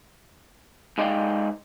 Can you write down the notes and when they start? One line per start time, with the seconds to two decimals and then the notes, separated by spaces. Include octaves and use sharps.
0.98 G#2 G#3 D#4 D5 F5 G5